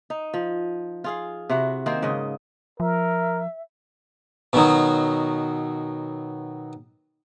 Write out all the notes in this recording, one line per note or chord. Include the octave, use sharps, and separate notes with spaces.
D#4
F3
F4 G#4 F5
C3 E4 F#4
D#3 A#3 C4 C5
G#2 C#3 D#5
F3 A#4 E5
B2 D#3 F#3